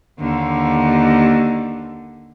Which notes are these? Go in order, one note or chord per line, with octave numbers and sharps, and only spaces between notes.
D#2 D3